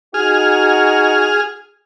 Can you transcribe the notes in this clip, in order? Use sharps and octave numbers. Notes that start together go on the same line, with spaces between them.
D#4 F#4 G#4 F6